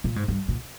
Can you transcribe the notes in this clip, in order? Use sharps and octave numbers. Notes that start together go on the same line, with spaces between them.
A#2
G#2
G2
A#2